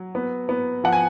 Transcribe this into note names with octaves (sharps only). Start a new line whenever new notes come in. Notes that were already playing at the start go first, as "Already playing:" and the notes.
Already playing: F#3
B3
B3
F3 F#5
G#5